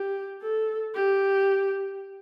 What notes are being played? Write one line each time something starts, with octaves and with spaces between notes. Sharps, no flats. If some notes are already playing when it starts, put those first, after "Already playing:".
Already playing: G4
A4
G4